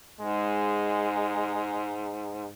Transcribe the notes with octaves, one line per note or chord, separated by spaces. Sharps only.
G#2 G#3